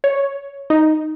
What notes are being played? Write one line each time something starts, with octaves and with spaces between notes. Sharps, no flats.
C#5
D#4